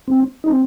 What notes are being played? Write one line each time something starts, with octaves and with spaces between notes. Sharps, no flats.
C4
D#4
C4